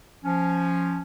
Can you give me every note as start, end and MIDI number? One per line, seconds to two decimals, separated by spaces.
0.24 1.00 53
0.24 1.00 61